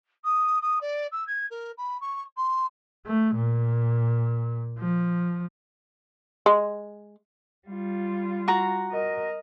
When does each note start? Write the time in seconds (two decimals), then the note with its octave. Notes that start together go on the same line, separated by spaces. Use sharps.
0.24 D#6
0.61 D#6
0.81 D5
1.12 E6
1.27 G#6
1.50 A#4
1.78 B5
2.01 C#6
2.37 C6
3.06 A3
3.36 A#2
4.79 F3
6.46 G#3
7.68 G3 F4
8.48 F#4 A#5
8.92 A#4 D#5